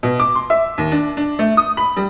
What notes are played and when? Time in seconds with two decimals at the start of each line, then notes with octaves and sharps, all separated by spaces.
0.03 B2
0.20 D6
0.35 C6
0.50 E5
0.78 D#2
0.92 D4
1.17 D4
1.39 A3
1.57 D#6
1.77 B5
1.97 G3